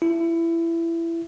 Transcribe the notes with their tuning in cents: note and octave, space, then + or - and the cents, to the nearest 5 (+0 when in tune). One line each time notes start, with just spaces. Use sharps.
E4 +20